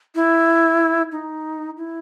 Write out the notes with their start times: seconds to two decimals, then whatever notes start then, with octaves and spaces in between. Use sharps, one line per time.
0.15 E4
1.12 D#4
1.77 E4